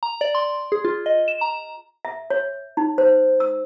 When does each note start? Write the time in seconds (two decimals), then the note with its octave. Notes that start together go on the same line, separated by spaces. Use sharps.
0.03 A#5
0.21 D5
0.35 C6
0.72 G#4
0.85 F4
1.06 D#5
1.28 E7
1.41 A#5
2.05 E5
2.30 C#5
2.77 D#4
2.98 C5
3.40 E6